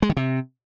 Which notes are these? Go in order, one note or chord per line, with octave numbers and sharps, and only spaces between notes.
G#3
D#3
C3